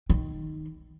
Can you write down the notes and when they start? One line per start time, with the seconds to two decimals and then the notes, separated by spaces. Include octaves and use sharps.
0.09 D#3